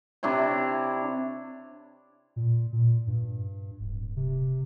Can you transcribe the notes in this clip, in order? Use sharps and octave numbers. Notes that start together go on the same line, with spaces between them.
C3 D4 E4 C#5
A#2
A#2
G2
D1
C3